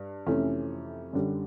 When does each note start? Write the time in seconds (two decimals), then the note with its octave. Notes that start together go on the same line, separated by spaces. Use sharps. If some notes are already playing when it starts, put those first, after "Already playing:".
Already playing: G2
0.26 F2 C3 E3 A3 C#4
1.13 F#2 D3 G3